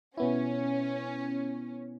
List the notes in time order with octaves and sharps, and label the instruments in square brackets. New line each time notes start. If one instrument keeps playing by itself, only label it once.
[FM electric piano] B2 B3 E4 [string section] C#4